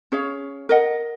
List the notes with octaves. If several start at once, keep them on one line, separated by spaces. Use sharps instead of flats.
C#4 G#4 C#5 F5
A#4 D#5 F#5